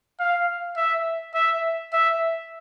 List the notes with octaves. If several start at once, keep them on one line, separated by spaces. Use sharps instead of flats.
F5
E5
E5
E5